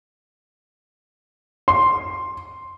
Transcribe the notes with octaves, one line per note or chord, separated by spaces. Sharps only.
C6